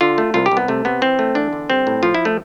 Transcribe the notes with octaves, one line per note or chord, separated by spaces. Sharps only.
D3 F4
A3
C2 F4
G4
C2
B3
C3 A3
C3 B3
E3 C4
A3
E2 D4
D3
G3 C4
A2
F3 F4
E4
A3